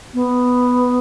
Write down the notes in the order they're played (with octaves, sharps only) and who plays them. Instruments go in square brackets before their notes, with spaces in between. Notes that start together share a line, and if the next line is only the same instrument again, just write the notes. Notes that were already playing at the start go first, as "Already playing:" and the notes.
[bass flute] B3